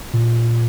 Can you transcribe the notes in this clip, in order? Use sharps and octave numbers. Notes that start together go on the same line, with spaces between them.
A#2